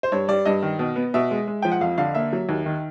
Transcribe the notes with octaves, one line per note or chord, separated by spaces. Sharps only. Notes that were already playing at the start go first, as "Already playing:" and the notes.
C5
G2 C#5
G3 D5
G2 D#5
D#3
B2
B3
B2 E5
G#3
G#3
F3 G5
F#5
F2 F5
D3 F5
A#3 E5
F#3
D#2
D#3